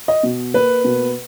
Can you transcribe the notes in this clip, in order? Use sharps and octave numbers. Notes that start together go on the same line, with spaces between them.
D#5
B2
A#3 B4
B2